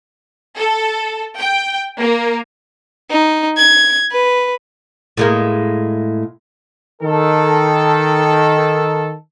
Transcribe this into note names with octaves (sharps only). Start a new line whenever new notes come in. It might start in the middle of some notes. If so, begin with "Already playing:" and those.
A4
G5
A#3
D#4
G#6
B4
A2 G#3 A#3
D#3 A4